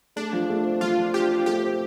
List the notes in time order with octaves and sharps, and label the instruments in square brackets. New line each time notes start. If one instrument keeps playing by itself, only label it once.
[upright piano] A3 [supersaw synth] D4
[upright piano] F3
A3
C4
[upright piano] F3 [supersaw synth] F4
[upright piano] F3
[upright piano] C4 [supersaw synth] G4
[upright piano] C4
[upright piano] A3 [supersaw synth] G4
[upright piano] C4